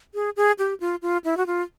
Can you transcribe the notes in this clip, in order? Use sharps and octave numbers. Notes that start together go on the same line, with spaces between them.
G#4
G#4
G4
F4
F4
E4
F#4
F4